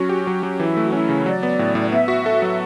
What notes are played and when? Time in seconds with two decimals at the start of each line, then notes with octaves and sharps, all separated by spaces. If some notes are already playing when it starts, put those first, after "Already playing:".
Already playing: F#3 C#4 F#4
0.09 G4
0.27 F#3
0.43 F#3
0.60 E3 E4
0.77 A3
0.83 F#4
0.92 C#4 E4
1.09 C#3
1.26 F#3 D5
1.43 B3
1.59 A2
1.75 A2
1.92 B3 E5
2.08 F#4
2.26 A4
2.42 F#3
2.48 E5